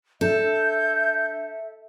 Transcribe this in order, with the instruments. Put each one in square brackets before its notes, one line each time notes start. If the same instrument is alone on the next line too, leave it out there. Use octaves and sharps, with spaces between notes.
[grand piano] D4 [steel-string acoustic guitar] A4 [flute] E5 [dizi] G6